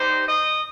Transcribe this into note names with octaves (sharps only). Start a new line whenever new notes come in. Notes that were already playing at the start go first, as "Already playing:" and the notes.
Already playing: G3 D#4 G4 C5
D#5